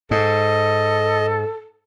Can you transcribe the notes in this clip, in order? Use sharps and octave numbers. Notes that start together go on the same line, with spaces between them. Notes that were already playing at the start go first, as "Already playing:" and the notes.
G#2 A4 D#5